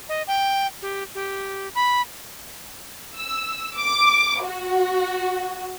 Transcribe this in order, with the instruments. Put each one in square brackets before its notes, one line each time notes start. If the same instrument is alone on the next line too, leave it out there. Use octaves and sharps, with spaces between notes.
[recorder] D#5
G5
G4
G4
B5
[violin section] E6
D6
F#4